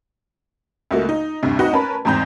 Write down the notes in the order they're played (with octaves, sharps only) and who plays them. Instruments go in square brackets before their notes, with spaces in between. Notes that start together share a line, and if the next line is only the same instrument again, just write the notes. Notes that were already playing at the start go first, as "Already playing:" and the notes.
[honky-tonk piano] C#2 A3 A#3 F#4
D#4
D2 G2 C3
C4 D#4 F#4 B4 D#5 F#5
C#4 A#4 B4 A5 B5
E2 G#2 C4 A#5 G6